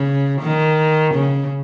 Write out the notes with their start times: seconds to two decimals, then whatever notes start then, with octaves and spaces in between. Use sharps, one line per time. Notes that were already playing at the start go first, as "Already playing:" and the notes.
Already playing: C#3
0.41 D#3
1.14 C#3